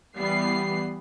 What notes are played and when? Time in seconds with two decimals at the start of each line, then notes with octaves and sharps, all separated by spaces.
0.16 E3 G3 B3 C7